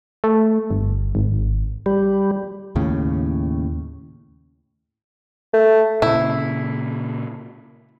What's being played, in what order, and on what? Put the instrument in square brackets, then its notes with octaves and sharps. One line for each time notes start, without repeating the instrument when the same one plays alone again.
[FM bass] A3
G1
G#1
[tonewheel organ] G3
[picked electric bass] D#2 A2 C#3
[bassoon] A3
[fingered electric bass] A#2 C#3 [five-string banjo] E4